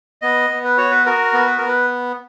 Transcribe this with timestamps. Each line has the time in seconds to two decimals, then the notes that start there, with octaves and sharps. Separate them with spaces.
0.22 B3 D#5
0.50 B3
0.64 B4
0.78 F#4 C#5
0.91 B4
1.06 F#4 A#4
1.33 B3
1.47 B4
1.58 B3 A#4
1.68 B4